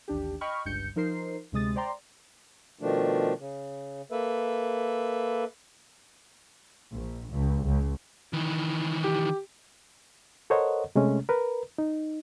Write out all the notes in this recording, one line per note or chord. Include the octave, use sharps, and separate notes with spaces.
A1 D#2 D4 G4
D#5 G5 B5 C#6 F6
G1 C#2 G2 G6 C#7
F3 D#4 A#4 C5 C7
D2 C3 G#3 D#6 A6
C5 D5 G5 A#5 C6
B2 D#3 F3 A3 D4
C#3
A#3 A4 B4 E5
A#1
C#2
C#2
D#3 E3
G4
A4 A#4 C5 C#5 D#5 F#5
C3 G#3 A3 C#4
A#4 B4
D#4